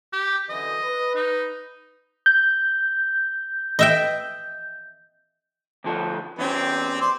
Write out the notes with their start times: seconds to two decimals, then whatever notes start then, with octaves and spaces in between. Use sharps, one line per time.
0.13 G4
0.49 F#2 D3 E3 D#5
0.83 B4
1.15 D#4
2.26 G6
3.79 D#5 E5 G5
5.84 D2 F3 A4
6.39 E2 C4 C#4 G4
7.01 C5 D5 C6